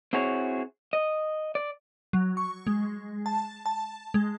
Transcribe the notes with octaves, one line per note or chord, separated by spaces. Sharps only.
C4 E4 F#4 G#4 C#5
D#5
D5
F#3
C#6
G#3
A5
A5
G#3